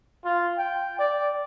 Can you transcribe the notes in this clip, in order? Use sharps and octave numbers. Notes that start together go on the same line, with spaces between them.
F4
G5
D5